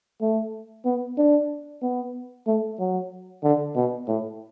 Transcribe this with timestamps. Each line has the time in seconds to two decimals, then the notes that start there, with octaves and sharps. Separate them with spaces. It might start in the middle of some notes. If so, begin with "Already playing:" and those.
0.21 A3
0.85 B3
1.18 D4
1.82 B3
2.47 A3
2.80 F#3
3.44 D3
3.76 B2
4.08 A2